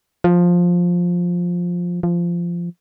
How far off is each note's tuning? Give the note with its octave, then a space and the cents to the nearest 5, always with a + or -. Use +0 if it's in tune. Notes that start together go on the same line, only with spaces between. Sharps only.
F3 +10
F3 -15